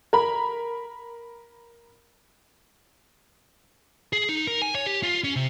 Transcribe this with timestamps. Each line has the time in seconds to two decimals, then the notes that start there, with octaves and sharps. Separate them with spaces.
0.13 A#4 B5
4.13 G#4
4.29 D#4
4.47 A#4
4.62 G#5
4.75 C#5
4.86 G4
5.03 F4
5.24 C#4
5.36 C3